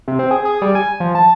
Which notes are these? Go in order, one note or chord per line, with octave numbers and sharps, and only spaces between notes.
C3
C4
G#4
G#4
G3
G#5
F3
A5